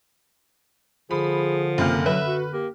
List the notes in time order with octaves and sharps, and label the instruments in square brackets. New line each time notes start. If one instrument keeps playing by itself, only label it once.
[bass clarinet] D3 [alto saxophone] F3 [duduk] G#4 [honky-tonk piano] B5
[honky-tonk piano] F#1 C3 F6 [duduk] A#3
[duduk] F#3 [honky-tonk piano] B4 [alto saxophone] E5
[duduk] F#4
[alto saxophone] A#3 [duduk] G4